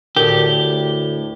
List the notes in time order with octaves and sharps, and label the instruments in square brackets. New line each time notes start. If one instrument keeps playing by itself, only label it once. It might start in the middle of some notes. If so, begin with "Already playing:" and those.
[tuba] D2 [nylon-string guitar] A2 [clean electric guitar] G4 [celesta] A#4